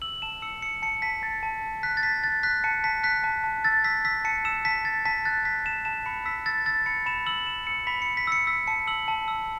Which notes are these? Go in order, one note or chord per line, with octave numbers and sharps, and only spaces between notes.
E6 F#7
A5 E7
E6 C#7
E6 C#7
A5 C#7
A5 B6
A5 A6
A5
A5
F#6 B6
A6
A5 B6
F#6 A6
F#6 B6
A5 C#7
A5 B6
F#6 B6
A5
A5
E6 A6
E6 B6
E6 B6
A5 C#7
E6 E7
A5 B6
A5 A6
A5 B6
F#6 A6
F#6 B6
A5 E7
A5 E7
B5 C#7
E6 B6
E6 A6
E6 A6
B5 C#7
B5 E7
E6 F#7
E6 E7
E6 C#7
B5 B6
C#7
E6
B6
E6 C#7
E6 B6
A5 C#7
E6 F#7
A5
E6